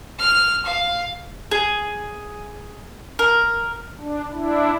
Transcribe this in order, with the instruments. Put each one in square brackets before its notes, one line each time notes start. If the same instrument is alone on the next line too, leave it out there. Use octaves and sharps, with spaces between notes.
[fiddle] F6
F5
[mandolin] G#4
A#4
[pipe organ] D4
D4 E4